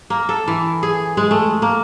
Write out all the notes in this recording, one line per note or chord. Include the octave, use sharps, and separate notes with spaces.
A#3
A4
E3
G#4
G#3
A3
A#3